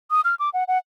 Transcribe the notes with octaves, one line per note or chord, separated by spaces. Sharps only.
D#6
F6
D6
F#5
F#5